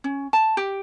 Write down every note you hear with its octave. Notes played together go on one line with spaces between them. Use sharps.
C#4
A5
G4